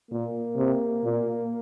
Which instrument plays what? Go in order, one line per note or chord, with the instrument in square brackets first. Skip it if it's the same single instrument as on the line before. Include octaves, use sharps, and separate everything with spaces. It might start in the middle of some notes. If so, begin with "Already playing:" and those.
[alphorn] A#2 [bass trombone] A#3
[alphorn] C3
A#2